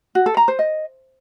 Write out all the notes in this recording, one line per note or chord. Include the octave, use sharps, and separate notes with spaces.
F#4
A4
A#5
C5
D#5